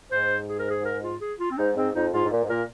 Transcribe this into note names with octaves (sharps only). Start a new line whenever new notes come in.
G#2 C5
G#4
A#4
G#4
A#4
F4
G#4
F4
C4
G#2 D#4
G#2 C4
F2 D#4
G#2 F4
G#2
A#2
G#2
A#2 A#4